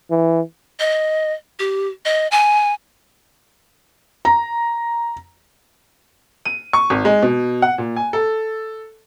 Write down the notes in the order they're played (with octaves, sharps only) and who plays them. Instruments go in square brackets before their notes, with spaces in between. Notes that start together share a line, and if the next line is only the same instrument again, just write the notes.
[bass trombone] E3
[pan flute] D#5
G4
D#5
G#5
[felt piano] A#5
[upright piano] D#7
C#6
G#1
G#3
B2
F#5
A#2
G#5
A4